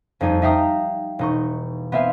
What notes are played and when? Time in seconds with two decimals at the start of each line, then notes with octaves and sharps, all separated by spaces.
0.21 F2 G3 D#4 G#5
0.42 D#4 E5 F5 G5 A#5 D#6
1.19 E1 D#4 C#6
1.92 B3 C4 E5 F5 G#5